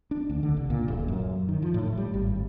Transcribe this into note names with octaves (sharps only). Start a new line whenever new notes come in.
D4
D2
D3
C2
A#2
D#1
F#2
D#3
F3
A2
G3
G#1